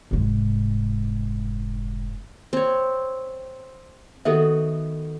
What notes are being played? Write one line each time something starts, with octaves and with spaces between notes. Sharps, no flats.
F1 G#2
C4 C#5
D#3 B3 F#4 A4 E5